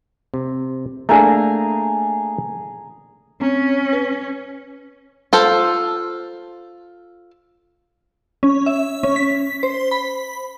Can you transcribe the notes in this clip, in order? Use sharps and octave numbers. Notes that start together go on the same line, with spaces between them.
C3
A3 A#3 D4 G#4 G#5 A#5
C4 C#4
B4
F4 A4 C5
C#4
E5
C#4
B6
C5
B5